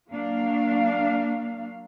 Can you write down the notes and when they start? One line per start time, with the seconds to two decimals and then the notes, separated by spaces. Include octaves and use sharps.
0.10 F#3 A#3 D4 F5